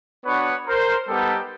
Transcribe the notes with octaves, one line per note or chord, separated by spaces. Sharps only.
B3 D4 F#4 B4 C#5
A#4 C5
G3 B3 D#4 G4 A4